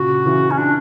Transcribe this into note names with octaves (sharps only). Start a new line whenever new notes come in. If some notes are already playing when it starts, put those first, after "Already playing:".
Already playing: A#2 C#3 F#4
C#3 E3
C#4
D4